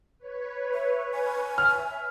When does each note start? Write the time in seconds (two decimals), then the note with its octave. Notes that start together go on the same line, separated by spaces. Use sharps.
0.18 B4 C#5
0.74 E5
1.13 G#5
1.58 E5 F6